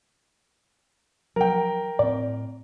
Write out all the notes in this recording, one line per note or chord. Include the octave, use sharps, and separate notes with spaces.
F3 F#3 A#4 G5
A2 C4 D5